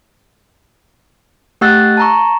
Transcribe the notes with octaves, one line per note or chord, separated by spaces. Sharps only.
A3 G4 F#5 E6 F#6 A6
A5 A#5 C#6